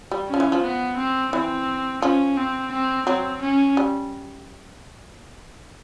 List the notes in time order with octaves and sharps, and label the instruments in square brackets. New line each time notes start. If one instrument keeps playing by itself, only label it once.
[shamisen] G3
[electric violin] C#4
[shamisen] F3
E3
F3
[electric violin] B3
C4
[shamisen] E3 [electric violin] C4
[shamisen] F3 [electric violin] C#4
[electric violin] C4
C4
[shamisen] F#3 [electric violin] C4
[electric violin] C#4
[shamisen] G3